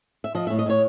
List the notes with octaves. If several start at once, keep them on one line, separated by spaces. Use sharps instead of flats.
E5
F3 D#5
A2 E5
D#5
A2 C#5